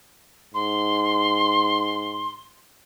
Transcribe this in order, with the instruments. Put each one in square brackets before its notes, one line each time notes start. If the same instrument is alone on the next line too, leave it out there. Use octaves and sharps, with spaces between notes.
[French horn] G#2 [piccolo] C6